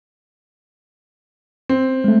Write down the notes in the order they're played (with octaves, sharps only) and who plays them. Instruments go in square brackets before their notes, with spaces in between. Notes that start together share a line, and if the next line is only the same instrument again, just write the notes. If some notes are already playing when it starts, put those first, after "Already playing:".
[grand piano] C4
[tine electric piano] G#3 A3